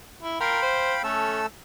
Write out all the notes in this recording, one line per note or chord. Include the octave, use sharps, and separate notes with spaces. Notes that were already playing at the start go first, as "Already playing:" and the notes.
E4
A#4 F5 G5 B5 C6
C5
A3 C#4 A4 E6